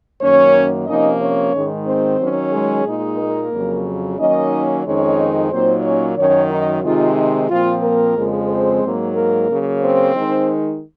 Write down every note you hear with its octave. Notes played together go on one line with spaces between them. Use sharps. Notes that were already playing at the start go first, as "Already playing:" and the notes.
F#2 D#3 F#3 A#3 C#4 C#5
C3 F3 A#3 C#4 D#4 D#5
C#4 C#5
G#2 D#3 G#3
C4 C5
D#3 F#3 C#4
G#3 G#4
A#2 G#3 D#4
A#3 A#4
F2 C#3 F#3
D#3 F#3 A#3 C#4 D#4 D#5
F2 D#3 G#3 C4 C#4 D#4 C#5
A#2 F#3 A#3 C4 D#4 C5
C#4 C#5
F#2 D#3 F#3 C#4 C#5
D#4
C3 D#3 G#3 C4 D#4 F4
D#4
A#2 F3 C4 F4
A#3 A#4
F2 C#3 F3 G#3
C4 C5
G#2 F#3 A#3
A#3 A#4
C#3 F#3 A#3
C4 C5
D#3 G#3 D#4